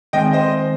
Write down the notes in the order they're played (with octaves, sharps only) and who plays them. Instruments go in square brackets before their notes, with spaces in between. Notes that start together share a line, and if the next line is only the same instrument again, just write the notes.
[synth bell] D#3 G#3 C4 [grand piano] D#5 G5
[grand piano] C5 D#5